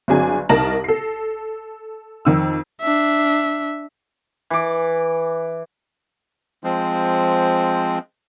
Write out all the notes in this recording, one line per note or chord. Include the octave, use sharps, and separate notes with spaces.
G1 F#3 C4 D4 G#4 G#5
C2 D#4 A#4 A5 A#6 F#7
A4 C7
F2 D#3 E6
D4 E5
E3 D6
F3 G#3 C4